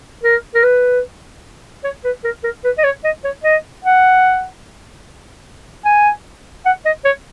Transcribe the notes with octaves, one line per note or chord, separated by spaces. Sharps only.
A#4
A#4
B4
C#5
B4
A#4
A#4
B4
D#5
C#5
D#5
C#5
D#5
F#5
G#5
F#5
D#5
C#5